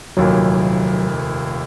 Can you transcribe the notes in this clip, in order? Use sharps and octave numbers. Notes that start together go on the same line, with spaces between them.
F1 D#2 A#2 F#3